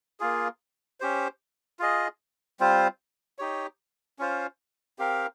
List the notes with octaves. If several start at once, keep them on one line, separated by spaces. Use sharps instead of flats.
A#3 F4 G#4
C#4 G4 C5
F4 G#4 D#5
G3 C4 F4 C5
D#4 G4 C#5
C#4 F4 C5
C4 G4 A#4 F5